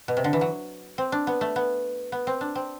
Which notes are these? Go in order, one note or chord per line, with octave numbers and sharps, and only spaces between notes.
B2
C3
D3
E3
F#3
C4
D4
B3
A3
B3
B3
C4
D4
C4